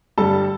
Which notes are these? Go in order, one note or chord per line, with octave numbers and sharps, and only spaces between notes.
G2 D3 G3 A4 A5